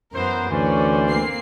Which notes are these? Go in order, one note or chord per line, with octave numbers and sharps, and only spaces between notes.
F#2 E3 B3 A#4 C5
D2 E3 C#4 D4 C5 D5
A#3 C4 C7